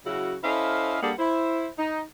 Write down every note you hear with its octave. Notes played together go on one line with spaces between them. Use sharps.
C#3 F#3 C#4 E4 F#4
C#4 E4 A4 C5 D#5 F5
G3 A#3 D4 G#4 A4 F#5
E4 C5
D#4